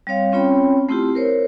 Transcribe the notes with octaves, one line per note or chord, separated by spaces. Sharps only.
G3 C4 C#5 F5
C4 C#4 F4 C#5 G5 B5
A3 C4 E4 F4 G4
A#4 C5 C#5